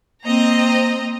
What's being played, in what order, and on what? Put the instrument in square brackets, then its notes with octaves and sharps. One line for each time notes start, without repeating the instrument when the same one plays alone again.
[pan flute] A#3 [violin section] C4 D#5 A#5